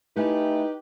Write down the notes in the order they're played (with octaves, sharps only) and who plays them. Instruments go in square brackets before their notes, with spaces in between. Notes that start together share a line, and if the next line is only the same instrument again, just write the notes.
[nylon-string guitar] A3 E4 G#5 [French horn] D#4 [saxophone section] G4 B4